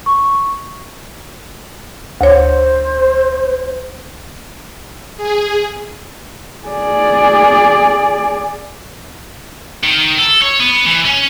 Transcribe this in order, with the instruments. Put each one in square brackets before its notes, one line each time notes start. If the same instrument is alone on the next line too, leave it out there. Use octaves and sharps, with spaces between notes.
[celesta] C#6
[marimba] D2 C#5 [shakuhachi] C5
[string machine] G#4
[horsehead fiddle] G#4 D5
[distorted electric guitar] D#3
A4
C#5
B3
E3
C#4